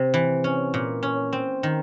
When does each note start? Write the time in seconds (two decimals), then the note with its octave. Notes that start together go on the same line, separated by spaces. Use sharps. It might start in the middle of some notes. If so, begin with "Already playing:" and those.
Already playing: C3
0.14 E3
0.44 C#4
0.74 A#2
1.03 C#4
1.33 C4
1.63 D#3